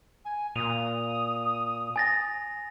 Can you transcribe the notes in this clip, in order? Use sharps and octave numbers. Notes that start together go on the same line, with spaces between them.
G#5
A#2 D#6 D#7 F7
G#5 A6 A#6